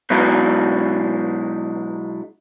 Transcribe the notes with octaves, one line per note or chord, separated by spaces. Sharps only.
B2 F#3 G#3 D4 E4